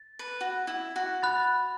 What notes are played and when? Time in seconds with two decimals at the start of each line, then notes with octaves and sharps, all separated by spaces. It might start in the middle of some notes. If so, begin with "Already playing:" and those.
Already playing: A6
0.19 B4
0.41 F#4
0.67 E4
0.96 F#4
1.22 B5 F#6 A6